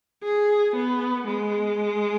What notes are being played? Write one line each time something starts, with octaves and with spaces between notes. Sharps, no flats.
G#4
B3
G#3